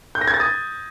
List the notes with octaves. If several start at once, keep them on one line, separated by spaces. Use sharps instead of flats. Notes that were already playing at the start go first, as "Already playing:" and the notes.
G6
A#6
G#6
A6
D#6